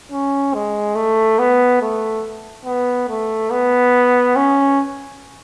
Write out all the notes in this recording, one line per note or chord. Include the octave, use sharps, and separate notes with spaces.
C#4
G#3
A3
B3
A3
B3
A3
B3
C#4